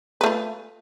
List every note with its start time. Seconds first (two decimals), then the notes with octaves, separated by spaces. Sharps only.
0.21 B4
0.23 A3
0.26 F4